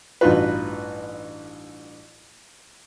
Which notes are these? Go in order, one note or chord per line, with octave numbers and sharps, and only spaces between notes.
A1 G2 D#4 F4 F#4 B4